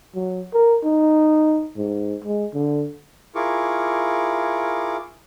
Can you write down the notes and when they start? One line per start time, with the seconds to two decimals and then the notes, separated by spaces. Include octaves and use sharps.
0.15 F#3
0.54 A#4
0.84 D#4
1.77 G#2
2.24 G#3
2.54 D3
3.35 E4 F4 G#4 A#4 C#6 D6